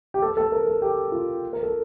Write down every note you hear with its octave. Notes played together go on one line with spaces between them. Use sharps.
G4
A4
A4
A#4
A4
G4
F4
A#4
A4